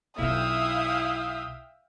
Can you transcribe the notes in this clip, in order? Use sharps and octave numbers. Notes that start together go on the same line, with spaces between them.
B1 E4 F4 E5 F5 G5 D#6